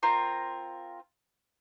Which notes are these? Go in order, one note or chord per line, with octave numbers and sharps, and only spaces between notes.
C4 F4 A#4 A#5